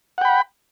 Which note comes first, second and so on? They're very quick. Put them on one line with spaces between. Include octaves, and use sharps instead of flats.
F#5 G5 B5